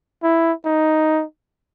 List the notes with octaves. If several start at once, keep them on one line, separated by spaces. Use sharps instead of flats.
E4
D#4